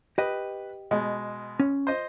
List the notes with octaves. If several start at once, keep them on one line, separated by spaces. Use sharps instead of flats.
G4 B4 D#5
B2 G#3
C#4
C5 D#5